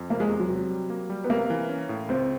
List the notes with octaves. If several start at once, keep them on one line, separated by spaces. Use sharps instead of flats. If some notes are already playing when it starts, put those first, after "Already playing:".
Already playing: F2
C3 A#3
G#3
E2
F#3
C3
G3
A#3
G3
B3
C3 A#3
E3
C#4
A2
C#2 C4